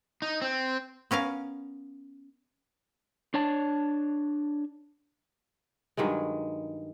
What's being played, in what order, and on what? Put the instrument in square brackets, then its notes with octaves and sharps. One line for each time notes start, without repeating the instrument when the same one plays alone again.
[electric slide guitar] D#4
C4
[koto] B3 C#4 A#4 F5
[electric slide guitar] D4 C#5 A5
[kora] G2 D#3 F#3 G#3